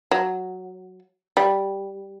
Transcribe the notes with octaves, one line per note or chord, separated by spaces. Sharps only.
F#3
G3